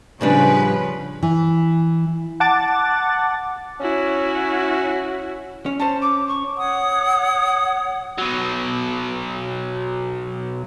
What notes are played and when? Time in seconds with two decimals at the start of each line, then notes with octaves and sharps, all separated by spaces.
0.21 A2 C#3 F3 G3 C#4 D4 B4
1.23 E3
2.40 F#5 A5 D6 A6
3.81 C#4 E4 F#4
5.66 C#4
5.80 C#4 C5 A5
6.01 D6
6.28 C#6
6.57 C#5 F#5 D#6
8.18 B2 F#3